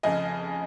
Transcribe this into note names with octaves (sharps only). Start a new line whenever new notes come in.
F1 F2 C#3 D#5 G#5